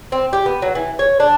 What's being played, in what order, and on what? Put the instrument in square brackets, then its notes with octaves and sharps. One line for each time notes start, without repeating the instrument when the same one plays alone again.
[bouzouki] C4
G4
B3
F#3
E3
C#5
D4